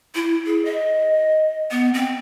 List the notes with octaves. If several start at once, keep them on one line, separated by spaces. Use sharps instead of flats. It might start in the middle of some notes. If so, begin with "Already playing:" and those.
E4
G#4
D#5
B3
C4